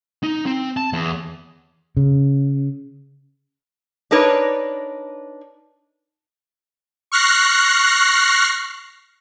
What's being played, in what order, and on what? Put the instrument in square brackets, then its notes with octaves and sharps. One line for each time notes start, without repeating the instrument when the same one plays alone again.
[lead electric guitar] D#4
C4
A5
E2
[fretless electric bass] C#3
[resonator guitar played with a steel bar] D4 D#4 A#4 B4 C#5 D5
[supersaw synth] C#6 F6 F#6 A#6 C7